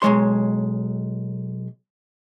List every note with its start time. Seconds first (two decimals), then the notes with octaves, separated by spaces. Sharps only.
0.02 B1 F#2 G#3 C#5 C6